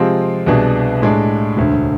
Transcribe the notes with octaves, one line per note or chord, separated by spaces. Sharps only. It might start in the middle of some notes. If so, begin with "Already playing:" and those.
Already playing: C3 F3 G#3 C4 F4
C2 B2 B3 D4 G#4
A2 G#3 D4
E1 D2 D3